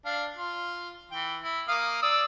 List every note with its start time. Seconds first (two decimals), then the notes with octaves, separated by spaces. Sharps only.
0.05 D4 F5
0.36 F4
1.11 E3 G5
1.42 E4
1.68 A#3 F5 D#6
2.02 D5 D#6 E6